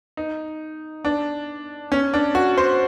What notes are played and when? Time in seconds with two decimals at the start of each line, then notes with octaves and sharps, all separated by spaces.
0.17 D#4
1.05 D4
1.92 C#4
2.14 D4
2.35 F#4
2.58 C5